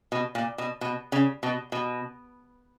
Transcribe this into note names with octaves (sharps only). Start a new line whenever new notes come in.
B2
A#2
B2
B2
C#3
B2
B2